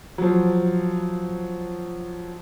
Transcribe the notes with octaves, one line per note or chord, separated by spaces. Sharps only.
F3 F#3